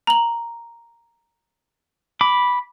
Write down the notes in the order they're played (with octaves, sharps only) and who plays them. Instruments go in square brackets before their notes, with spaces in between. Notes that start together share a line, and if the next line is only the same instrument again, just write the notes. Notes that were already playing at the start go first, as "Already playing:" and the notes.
[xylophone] A#5 F#7
[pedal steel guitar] B5 D6